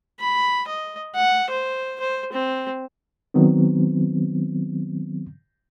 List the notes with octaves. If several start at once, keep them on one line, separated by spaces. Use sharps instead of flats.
B5
D#5
F#5
C5
C5
C4
D#3 F#3 B3 C4